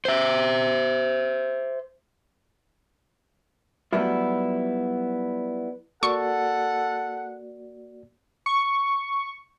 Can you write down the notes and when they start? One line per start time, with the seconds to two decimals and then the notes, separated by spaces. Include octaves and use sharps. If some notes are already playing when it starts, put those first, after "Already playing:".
0.05 C5 E5
3.93 F#3 G3 A3 B3 E4 F4
6.03 A#3 F#4 A4 D5 F#5 C#6
8.46 C#6